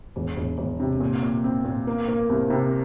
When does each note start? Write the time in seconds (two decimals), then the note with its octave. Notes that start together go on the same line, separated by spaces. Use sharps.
0.16 E1
0.37 E1
0.58 E1
0.80 C3
1.00 A#2
1.23 A#2
1.44 C4
1.65 A#2
1.87 A#3
2.08 A#3
2.29 C2
2.50 C3